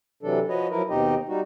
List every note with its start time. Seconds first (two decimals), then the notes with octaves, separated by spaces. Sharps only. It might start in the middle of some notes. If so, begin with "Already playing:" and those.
0.23 C3 E3 F#3 D4 A4
0.49 F3 F#4 B4 C#5 D#5
0.71 F3 F#3 E4 A#4 B4
0.89 D#2 B2 C4 D#4 G4 D#5
1.29 G3 D#4 F#4